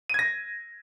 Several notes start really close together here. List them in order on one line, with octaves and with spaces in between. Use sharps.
D#7 G#6 A#6